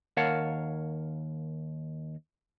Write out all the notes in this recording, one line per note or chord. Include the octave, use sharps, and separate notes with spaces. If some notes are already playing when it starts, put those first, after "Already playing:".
D#2 A#4 C#5 F5 F#5 A5